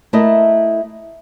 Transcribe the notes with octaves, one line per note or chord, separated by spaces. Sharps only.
A3 E4 A4 A#4 D#5